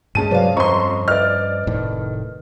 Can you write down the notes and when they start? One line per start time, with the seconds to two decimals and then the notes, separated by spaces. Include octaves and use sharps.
0.15 G2 G#3 C#4 A5 D#7
0.31 C3 F#3 B4 D5 F5
0.57 F2 F3 D#5 A#5 C6 C#6
1.08 B4 D5 D#5 F6
1.67 F1 A2 D#3